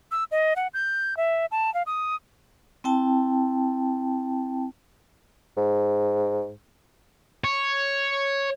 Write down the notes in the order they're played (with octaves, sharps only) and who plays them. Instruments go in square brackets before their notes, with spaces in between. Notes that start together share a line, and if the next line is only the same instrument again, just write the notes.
[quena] E6
D#5
F#5
G6
E5
A5
F5
D#6
[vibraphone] C4 E4 G5 A5
[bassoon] G#2
[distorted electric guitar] C#5